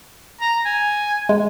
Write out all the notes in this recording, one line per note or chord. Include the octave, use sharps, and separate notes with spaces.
A#5
G#5
G#3